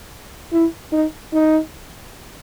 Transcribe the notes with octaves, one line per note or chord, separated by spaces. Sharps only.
E4
D#4
D#4